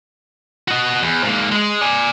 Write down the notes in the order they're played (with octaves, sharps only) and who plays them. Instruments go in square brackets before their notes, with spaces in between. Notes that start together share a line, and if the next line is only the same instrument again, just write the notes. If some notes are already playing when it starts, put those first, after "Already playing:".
[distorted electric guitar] F#4 D#5
E2
G#2 A#3
G#3
D5 G#5